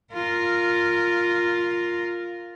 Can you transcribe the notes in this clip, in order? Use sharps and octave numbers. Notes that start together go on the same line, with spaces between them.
F4 A#4